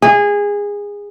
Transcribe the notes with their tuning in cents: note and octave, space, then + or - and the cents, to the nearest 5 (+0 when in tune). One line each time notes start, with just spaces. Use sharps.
G#4 -20